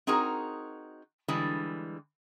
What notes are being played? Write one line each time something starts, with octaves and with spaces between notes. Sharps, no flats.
C4 D#4 F#4 G#4 A#4
D3 E3 G3 G#3